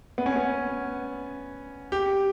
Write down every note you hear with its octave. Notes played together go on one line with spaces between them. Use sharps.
B3
C#4
B3
G4